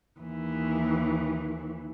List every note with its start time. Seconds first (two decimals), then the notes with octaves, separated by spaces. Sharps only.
0.20 D#2 E3